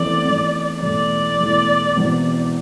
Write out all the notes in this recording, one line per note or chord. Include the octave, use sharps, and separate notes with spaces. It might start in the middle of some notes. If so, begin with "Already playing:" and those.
Already playing: E2 E3 A3 C4 D5
E2 E3 A3 C4
E1 E2 E3 A3 D5
E1 E2 E3 A3
E1 E2 E3 C4 E4